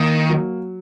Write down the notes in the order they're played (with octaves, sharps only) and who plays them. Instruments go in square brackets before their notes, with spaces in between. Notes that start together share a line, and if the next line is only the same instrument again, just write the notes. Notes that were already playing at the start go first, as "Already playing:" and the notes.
Already playing: [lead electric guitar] D#3 [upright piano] A#3
[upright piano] F#3